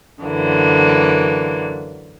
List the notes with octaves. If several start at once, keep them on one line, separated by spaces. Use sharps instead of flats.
F#2 D3 E3 A#3